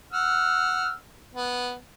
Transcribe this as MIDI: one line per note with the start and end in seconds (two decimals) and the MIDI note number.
0.13 0.92 78
0.13 0.92 88
0.13 0.92 89
1.34 1.74 59